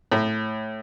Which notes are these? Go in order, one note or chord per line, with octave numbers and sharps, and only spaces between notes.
A2